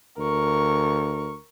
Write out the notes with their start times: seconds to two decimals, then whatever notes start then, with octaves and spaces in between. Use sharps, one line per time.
0.18 D2 A#4 C#6